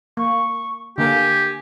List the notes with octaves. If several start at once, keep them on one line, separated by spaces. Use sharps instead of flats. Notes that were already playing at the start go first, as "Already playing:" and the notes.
A#3 C#6
D3 A#3 G4 A#4 G#5